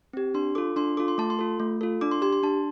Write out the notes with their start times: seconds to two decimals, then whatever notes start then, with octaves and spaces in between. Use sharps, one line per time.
0.13 C4 G4
0.34 D4 C6
0.55 F4 A4 D6
0.76 D4 C6
0.97 F4 A4 D6
1.08 C6
1.18 A3 A5
1.30 C6
1.39 F4 A4
1.60 A3
1.81 F4 A4
2.01 D4 D6
2.11 C6
2.22 G4 C6
2.33 C6
2.43 D4 A5